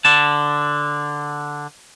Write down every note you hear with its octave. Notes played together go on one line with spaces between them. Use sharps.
D3 A5